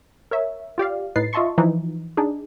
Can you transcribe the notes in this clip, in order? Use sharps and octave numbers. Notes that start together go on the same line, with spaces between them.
A#4 C#5 E5
F4 G4 D5 F5
A2 D#4 B4 A6 C7
F4 D#5 E5 A5 C6 C#6
E3 F3 D#4
D4 D#4 G#4